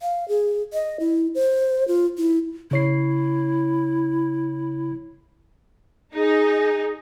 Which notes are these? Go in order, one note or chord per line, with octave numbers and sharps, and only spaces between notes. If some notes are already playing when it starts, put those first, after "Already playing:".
F5
G#4
D#5
E4
C5
F4
E4
C#3 E4 C#5 C7
D#4 G#4